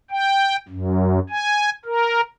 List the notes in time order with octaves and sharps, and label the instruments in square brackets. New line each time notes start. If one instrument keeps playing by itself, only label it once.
[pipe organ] G5
F#2
G#5
A#4